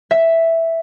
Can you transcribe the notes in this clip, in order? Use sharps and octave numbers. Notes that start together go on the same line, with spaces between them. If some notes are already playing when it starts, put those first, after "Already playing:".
E5